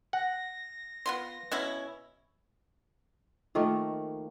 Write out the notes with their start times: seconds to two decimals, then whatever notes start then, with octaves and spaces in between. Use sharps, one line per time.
0.13 F#5 A#6
1.06 B3 F4 C6
1.52 B2 C#4 E4
3.55 D#3 F3 A3 A#3